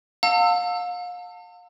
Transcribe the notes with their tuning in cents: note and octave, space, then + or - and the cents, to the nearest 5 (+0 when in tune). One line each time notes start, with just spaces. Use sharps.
F5 +35 A5 +40 E6 +0